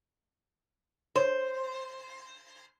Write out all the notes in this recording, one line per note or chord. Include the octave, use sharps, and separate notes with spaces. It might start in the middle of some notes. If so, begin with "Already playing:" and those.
C5 C#5